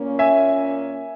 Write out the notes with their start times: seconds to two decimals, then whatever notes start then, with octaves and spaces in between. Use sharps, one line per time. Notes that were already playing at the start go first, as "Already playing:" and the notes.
Already playing: A#2 A#3 C#4
0.19 E5 G#5